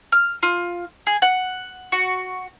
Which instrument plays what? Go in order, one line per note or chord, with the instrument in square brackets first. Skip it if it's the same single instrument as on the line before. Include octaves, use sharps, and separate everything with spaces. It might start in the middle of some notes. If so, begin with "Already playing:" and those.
[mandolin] F6
F4
G#4
F#5
F#4